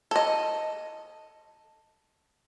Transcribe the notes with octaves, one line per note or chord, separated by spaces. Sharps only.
A4 D#5